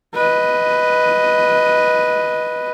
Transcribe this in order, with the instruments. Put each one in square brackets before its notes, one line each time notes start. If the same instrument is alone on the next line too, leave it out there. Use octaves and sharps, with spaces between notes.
[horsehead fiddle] B4 D#5